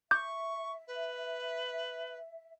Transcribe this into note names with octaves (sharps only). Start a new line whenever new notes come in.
E5 C#6 D6 G6
B4